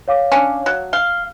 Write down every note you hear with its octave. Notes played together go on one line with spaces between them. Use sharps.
C#5 F5 D6
C#4 D4
F#3
F5 G7